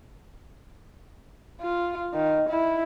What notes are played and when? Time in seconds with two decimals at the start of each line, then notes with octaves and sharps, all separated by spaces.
1.61 F4
2.14 D#3
2.49 E4